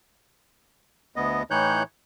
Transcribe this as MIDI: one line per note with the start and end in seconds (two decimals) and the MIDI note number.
1.16 1.43 38
1.16 1.43 59
1.16 1.43 75
1.51 1.83 45
1.51 1.83 52
1.51 1.83 63
1.51 1.83 73
1.51 1.83 90
1.51 1.83 91